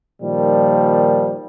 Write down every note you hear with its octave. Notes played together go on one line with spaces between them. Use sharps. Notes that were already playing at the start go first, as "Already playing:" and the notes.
A#2 D#3 F3 G3